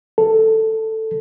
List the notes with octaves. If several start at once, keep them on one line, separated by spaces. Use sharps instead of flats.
A4